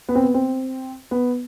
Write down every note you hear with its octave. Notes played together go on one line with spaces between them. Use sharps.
B3
C4
B3
C4
B3